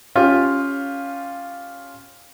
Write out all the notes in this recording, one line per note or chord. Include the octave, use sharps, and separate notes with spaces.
C#4 F4 G4